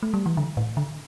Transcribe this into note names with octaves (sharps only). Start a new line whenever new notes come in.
A3
G3
E3
D3
A2
D3